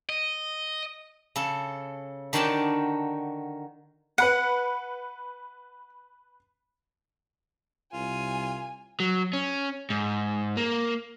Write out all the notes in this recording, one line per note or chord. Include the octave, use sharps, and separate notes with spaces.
D#5
C#3 A4
D3 D#3 F#4 D5 G5 A5
B4 F#5 B5 C#7
C2 F4 G#5
F#3
C#4
G#2
A#3